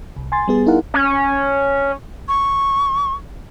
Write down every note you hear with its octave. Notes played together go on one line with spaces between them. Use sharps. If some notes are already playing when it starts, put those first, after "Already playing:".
C2
G#5 C6 A6
G3 B3 G#4
D#4 E4 G#4 A#4 F5 F#5
C#4
C#6